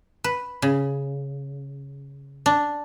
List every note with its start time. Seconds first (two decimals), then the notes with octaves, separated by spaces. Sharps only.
0.24 B4
0.62 C#3
2.46 D4